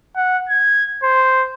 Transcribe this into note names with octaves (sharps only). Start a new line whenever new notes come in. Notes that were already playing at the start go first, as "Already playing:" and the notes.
F#5
G#6
C5